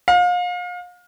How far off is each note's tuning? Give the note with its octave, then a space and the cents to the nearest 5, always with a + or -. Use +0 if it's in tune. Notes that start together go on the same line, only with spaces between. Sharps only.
F5 +35